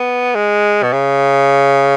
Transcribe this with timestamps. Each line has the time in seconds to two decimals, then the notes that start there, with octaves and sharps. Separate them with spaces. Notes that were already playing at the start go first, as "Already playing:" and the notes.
Already playing: B3
0.35 G#3
0.83 B2
0.93 C#3